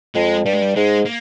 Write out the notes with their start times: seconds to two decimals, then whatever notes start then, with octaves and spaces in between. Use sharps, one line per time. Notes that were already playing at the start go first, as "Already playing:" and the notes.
0.15 F2 G#3
0.45 G2 G3
0.53 G#3
0.62 G3
0.75 G#2 G#3
1.05 A#3